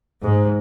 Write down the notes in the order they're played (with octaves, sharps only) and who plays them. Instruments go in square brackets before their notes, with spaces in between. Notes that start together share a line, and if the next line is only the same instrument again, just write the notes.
[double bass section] G#2